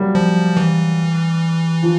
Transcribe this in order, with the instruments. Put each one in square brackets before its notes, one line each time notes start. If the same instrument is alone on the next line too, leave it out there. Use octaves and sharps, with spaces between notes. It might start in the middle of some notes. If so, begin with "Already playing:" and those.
Already playing: [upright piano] F#3 G3 A#3
[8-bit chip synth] F3
E3
[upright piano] F3